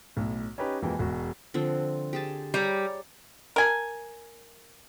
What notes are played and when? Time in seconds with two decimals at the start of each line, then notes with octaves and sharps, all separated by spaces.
0.16 B1 A2
0.58 C#4 D#4 G4 B4
0.82 F2 B2 E3 G#3 A#3 G5
0.99 E1 G#3 F#4
1.54 D3 F3 C4
2.13 G4 G#4 A5
2.54 G3 C#5 A#5
3.56 A#4 G#5